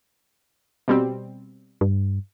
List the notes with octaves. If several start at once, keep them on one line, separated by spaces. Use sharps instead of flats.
B2 G3 C4
G2